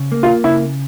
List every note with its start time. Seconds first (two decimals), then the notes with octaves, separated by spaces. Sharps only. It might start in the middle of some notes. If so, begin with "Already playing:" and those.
Already playing: C#3
0.12 A#3
0.23 F4
0.44 C#3 E4